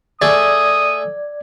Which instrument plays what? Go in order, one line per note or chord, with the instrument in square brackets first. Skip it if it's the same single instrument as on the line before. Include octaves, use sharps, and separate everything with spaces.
[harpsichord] A3 G#4 A5 [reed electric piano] D5 G#6 [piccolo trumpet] D#6